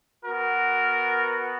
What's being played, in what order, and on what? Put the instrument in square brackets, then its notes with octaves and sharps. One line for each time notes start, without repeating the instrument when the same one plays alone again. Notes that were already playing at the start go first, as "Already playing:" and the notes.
[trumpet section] B3 F#4 A#4